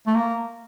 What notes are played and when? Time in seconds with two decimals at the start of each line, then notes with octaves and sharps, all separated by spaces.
0.07 A3
0.15 A#3